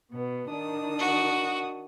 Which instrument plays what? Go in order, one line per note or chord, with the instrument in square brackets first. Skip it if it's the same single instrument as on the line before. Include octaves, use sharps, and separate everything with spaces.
[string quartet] B2 B3
D#3 D4 D#6
[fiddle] F#4